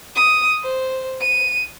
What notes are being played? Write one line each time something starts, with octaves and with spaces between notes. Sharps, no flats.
D#6
C5
D#7